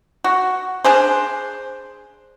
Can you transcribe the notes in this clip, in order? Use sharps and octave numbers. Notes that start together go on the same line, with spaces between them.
F#4
D4 G#4 C5